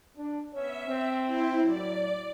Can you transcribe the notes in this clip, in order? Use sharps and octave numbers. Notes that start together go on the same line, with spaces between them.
D4
B3 C#4 C#5 E5
C4
E4
A2 F#3 D5